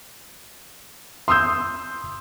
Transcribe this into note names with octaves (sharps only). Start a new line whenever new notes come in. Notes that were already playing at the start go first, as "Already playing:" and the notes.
C6 D#6 E6 G6